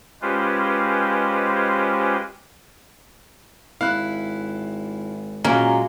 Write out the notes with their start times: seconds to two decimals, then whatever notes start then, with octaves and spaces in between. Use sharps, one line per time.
0.22 G#3 C#4 F4 G4 B4 C5
3.81 G#1 E4 F5 F#6
5.44 A#2 F#3 G#3 A#3 C#4